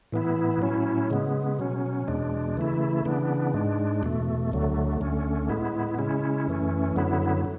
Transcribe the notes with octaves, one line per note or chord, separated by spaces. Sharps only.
A2 E3 B3 E4
A2 F#3 C#4 E4
C#3 G#3 B3
B2 F#3 C#4
E2 B2 G#3 D4
C#3 E3 A3 E4
C#3 E3 B3 D4
G#2 G#3 D4
E2 B2 A3
D2 D3 F#3 A3
D2 D3 A3 C#4
A2 G#3 B3 E4
C#3 G#3 C#4 E4
F#2 E3 A3 C#4
F#2 D3 F#3 B3 E4